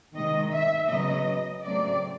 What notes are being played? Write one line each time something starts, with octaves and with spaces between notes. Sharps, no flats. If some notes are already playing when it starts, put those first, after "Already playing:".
C3 D#3 G#3 D#5
E5
C#3 F#3 B3 D#5
C#3 F#3 A3 C4 D5